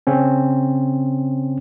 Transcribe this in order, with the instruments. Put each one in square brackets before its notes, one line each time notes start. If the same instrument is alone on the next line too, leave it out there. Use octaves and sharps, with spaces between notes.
[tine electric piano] C#3 C4 C#4